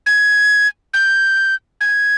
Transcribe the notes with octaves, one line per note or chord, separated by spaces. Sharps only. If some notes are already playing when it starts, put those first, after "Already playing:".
G#6
G6
G#6